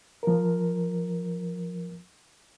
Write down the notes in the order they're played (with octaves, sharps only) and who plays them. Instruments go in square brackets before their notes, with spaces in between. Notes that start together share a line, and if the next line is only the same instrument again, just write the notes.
[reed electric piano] F3 A#4